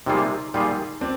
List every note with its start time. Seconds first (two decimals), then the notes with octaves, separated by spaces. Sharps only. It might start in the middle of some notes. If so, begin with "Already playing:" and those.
0.06 C3 G3 A#3 D#4 F4 G#4
0.54 A#2 G3 A#3 D#4 F4 G#4
1.01 C4 D4